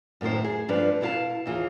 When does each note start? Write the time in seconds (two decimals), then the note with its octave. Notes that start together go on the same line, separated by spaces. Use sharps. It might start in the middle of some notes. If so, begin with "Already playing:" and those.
0.21 F#2 A2 D#3 E4 C5
0.44 G#4
0.68 G2 F3 D4 B4
1.01 B2 E4 G4 F5 A5
1.46 D#2 E3 F4 G#4